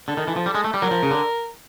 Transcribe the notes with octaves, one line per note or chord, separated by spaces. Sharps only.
D3 A4
D#3
E3
F3
G3
G#3
A3
G3
F#3 A#4
F3
C#3
D3